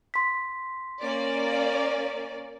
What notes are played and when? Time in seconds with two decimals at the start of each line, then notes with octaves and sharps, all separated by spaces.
0.14 C6 B6
1.02 A#3 C#4 D5